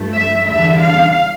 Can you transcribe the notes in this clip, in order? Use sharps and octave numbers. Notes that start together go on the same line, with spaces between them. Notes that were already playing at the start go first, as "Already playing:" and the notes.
Already playing: G2 F3 A3
E5
E2 D3 G3 D4 E5
F5